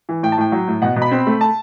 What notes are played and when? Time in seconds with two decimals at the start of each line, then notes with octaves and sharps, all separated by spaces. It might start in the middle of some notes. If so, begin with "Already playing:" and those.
0.09 E3
0.23 A2 G5
0.32 A5
0.38 A2 G5
0.52 F#3
0.68 A2
0.82 B2 F#5
0.96 B2
1.02 B5
1.12 C4
1.27 A3
1.41 A5